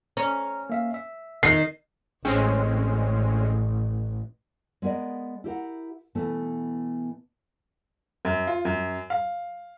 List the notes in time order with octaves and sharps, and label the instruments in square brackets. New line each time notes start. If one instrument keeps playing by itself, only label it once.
[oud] C#4 [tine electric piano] A#5
[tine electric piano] A#3 E5 F5
E5
[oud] D#3 [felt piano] C7
[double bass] A1 [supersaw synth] G#3 C4 C#4
[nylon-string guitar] G#3 B3 A#4 D5 D#5
E4 G4 A#4 F#5
B2 E3 A3 B3
[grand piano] F#2
F4
F#2
F5